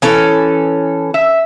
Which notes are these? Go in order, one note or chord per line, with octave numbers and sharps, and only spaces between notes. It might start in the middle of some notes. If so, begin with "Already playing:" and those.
E3 C#4 A4
E5